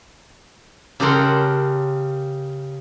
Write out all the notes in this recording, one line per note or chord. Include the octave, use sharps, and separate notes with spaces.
C#3 G4 A4 A#4 F#5 C6